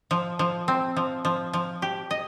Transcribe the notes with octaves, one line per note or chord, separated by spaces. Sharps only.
F3
F3
C4
F3
F3
F3
G4
D#5